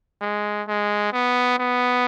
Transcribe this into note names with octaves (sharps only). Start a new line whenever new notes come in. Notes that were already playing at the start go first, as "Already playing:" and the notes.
G#3
G#3
B3
B3